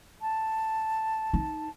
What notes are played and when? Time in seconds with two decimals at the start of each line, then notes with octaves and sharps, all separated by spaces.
0.22 A5
1.33 D#4